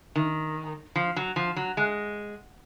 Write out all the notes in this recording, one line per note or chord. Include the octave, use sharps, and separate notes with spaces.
D#3
F3
F#3
F3
F#3
G#3